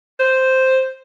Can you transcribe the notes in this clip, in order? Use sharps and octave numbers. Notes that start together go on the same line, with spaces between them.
C5